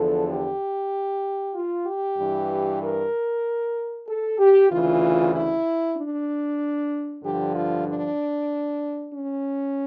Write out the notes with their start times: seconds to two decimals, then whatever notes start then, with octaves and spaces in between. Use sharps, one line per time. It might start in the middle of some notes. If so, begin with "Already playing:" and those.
Already playing: E2 D3 F3 A4
0.28 G4
1.54 F4
1.86 G4
2.18 G2 E3
2.81 A#4
4.07 A4
4.39 G4
4.70 D2 C#3 E3 F4
5.34 E4
5.96 D4
7.22 G2 D3 F3 G4
7.54 F4
7.86 D4
9.12 C#4